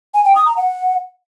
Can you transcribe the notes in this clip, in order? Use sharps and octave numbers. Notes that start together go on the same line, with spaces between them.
G#5
G5
D#6
A#5
F#5